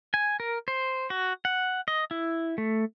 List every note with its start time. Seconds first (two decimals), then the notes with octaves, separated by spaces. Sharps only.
0.14 G#5
0.40 A#4
0.68 C5
1.10 F#4
1.45 F#5
1.88 D#5
2.11 E4
2.58 A3